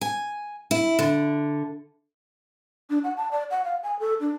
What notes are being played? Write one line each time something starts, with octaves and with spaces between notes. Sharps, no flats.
G#5
E4
D3
D4
F#5
A5
D5
F#5
F5
G#5
A4
D4